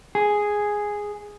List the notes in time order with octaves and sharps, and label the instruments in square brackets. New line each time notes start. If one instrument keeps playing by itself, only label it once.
[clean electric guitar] G#4